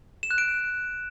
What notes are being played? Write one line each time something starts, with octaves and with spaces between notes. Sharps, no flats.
E7
F#6
D7